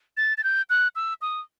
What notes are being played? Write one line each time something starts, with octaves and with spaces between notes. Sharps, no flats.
A6
A6
G6
F#6
E6
D#6